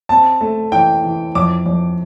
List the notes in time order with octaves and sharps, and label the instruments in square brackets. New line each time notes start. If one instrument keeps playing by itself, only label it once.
[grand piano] C4 A5
A3
E3 G5
E3
F2 D6
F2